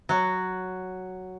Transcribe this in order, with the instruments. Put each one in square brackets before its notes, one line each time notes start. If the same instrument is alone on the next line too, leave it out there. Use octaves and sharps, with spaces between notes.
[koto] F#3 F#4